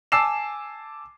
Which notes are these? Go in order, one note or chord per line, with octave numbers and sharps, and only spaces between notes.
G#5 A5 D6 E6 C7 E7